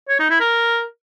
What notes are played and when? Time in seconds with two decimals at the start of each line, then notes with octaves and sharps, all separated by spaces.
0.09 C#5
0.19 D#4
0.30 E4
0.40 A#4